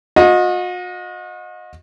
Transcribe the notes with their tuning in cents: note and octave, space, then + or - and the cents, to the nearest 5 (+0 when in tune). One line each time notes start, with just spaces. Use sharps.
F#4 -45 D#5 +0